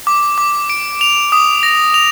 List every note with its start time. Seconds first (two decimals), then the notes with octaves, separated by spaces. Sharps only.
0.07 D6
0.38 D6
0.70 D7
1.01 F7
1.32 D#6
1.63 A#6
1.94 F7